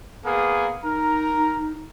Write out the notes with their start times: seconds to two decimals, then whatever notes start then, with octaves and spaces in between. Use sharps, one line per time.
0.25 A#3 B3 G#4
0.83 D#4 A#4 A#5